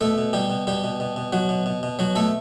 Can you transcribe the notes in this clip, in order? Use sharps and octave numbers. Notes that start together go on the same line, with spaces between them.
B2 A3 A4
B2
B2 G3 G4
B2
B2 G3 G4
B2
B2
B2
B2 F#3 F#4
B2
B2
B2
B2 F#3 F#4
B2 A3 A4